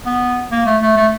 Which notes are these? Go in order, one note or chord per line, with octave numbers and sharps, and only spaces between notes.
B3
A#3
A3
A3
A3